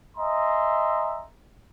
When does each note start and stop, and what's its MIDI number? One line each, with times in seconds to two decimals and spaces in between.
0.17 1.24 75
0.17 1.24 76
0.17 1.24 80
0.17 1.24 82
0.17 1.24 84